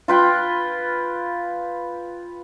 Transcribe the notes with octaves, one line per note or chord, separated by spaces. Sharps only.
F4 B4 G5